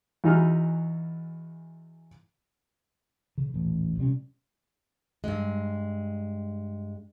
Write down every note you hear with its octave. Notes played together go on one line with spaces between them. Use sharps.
E2 E3 D#4 F#4 A#5 F6
C#3
D#1 A1
C3 G3 C4 C#4
G2 G#3